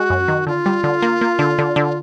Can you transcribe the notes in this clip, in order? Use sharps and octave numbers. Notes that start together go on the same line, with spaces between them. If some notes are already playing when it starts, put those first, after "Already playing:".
Already playing: G#3 F#4
F#2
D#3
D3 F4
G3
D3
A#3
A#3
D3
D3
D3